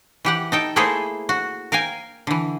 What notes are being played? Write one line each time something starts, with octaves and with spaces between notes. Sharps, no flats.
E3 G4 F#5
D#4 A4 G5
A3 A#3 E4 G#4 A4 C5
F#4
A#4 F5 G5 G#5
D3 E3